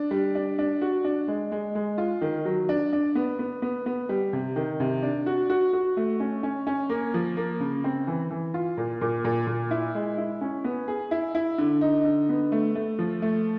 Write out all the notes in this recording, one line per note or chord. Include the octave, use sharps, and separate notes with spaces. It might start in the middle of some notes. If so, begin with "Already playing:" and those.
Already playing: D4
G3
D4
D4
F#4
D4
G#3
G#3
G#3
F4
D#3
F#3
D4
D4
B3
B3
B3
B3
G3
C3
D#3
C3
D4
F#4
F#4
F#4
A3
C#4
C#4
C#4
A#3
F3
A#3
C#3
C4
E3
E3
F4
A#2
A#2
A#2
A#2
E4
G#3
E4
C#4
B3
G#4
E4
E4
D3
D#4
D3
B3
A3
A3
F3
A3